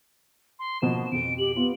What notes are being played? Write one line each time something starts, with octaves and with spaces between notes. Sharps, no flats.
C6
B2 F3 A#3 E7
F2 B2 D7
G4 F#7
B3 F4